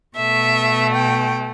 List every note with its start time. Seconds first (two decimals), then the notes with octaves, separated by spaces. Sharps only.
0.16 B2 A3 E5
0.96 G5